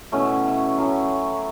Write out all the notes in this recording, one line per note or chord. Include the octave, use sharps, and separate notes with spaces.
B2 A3 C#4 E4
A2 F#3 C#4